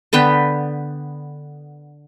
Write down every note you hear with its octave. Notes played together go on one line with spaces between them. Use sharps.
D3 B3 B4 G5